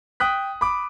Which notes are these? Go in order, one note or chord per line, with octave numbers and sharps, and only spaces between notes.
G5 D#6 F#6 B6
B5 D6